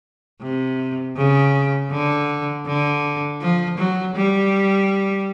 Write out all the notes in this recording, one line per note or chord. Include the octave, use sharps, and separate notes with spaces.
C3
C#3
D3
D3
F3
F#3
G3